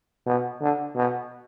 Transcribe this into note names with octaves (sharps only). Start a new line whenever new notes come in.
B2
D3
B2